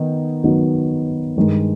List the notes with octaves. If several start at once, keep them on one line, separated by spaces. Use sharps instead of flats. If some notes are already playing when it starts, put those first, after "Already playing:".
Already playing: D#3 B3 D#4
D#3 F#3 B3 D#4
G2 D#3 G#3